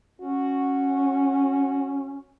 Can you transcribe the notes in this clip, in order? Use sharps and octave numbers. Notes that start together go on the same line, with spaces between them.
C#4 F#4